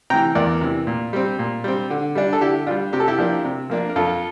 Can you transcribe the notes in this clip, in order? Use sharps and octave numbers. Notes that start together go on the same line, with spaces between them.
C3 E3 G5 A#5
E2 A#4 D5
C3 E3
A#2
G3 C4
A#2
G3 C4
D3
G3 D4
A4
D3 E4 G4
G3 D4 F4
C3 G4
A4
E4 G4
F3 A#3 D4
C3
F3 A#3 D4
A#4
F2 F4 A4